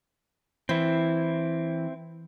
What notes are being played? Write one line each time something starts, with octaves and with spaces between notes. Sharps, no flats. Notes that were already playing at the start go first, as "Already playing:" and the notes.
E3 C4 E4